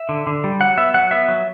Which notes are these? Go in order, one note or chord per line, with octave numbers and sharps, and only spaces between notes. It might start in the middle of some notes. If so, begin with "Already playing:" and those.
Already playing: E5
D3
D3
G3
F#3 F#5
B3 E5
F#3 F#5
B3 E5
F#3